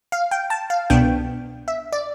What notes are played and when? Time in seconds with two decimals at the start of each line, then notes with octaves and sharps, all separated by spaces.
0.12 F5
0.31 G5
0.50 A5
0.70 F5
0.90 C2 B2 B3 D4 G5
1.68 E5
1.92 D5